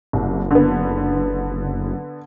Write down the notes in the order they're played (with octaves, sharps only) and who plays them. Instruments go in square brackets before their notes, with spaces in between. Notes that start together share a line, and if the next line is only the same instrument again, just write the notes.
[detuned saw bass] F#1 [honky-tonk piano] C2
[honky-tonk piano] D3 B3